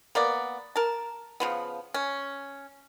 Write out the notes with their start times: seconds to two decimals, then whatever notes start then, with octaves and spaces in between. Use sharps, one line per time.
0.15 A#3 B3 D5
0.76 A#4 A5
1.40 C#3 F3 B3
1.94 C#4